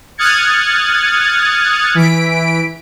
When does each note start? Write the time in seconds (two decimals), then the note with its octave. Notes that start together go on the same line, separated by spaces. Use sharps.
0.18 D#6 F6 F#6 G#6 A6 C#7
1.95 E3 B6 D7